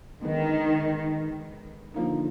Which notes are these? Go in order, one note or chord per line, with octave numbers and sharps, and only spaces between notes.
D3 D#3 G#3 B3
D3 F3 A#3 D#4